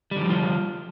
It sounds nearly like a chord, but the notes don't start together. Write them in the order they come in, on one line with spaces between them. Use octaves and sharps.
G3 D3 E3 F3 F4